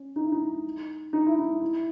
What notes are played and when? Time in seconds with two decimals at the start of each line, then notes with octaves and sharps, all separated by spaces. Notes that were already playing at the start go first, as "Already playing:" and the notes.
Already playing: C#4
0.16 D#4
0.24 E4
0.32 D#4
1.13 D#4
1.26 E4
1.39 D#4
1.62 E4